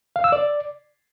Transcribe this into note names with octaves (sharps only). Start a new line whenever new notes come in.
F5
E6
D5